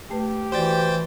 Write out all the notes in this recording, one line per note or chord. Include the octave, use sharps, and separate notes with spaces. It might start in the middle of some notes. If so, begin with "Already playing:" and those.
A3 G4 B4
E3 F#4 C5 D5 G5 A6